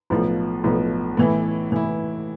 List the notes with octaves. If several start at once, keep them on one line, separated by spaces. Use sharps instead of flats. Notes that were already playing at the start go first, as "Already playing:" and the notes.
B1 A2 F3 B3
B1 A2 F3 B3
A2 E3 B3 E4
A2 E3 B3 E4